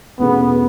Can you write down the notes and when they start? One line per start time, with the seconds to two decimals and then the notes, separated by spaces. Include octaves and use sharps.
0.19 E2 B2 A3 B3 C#4 G#4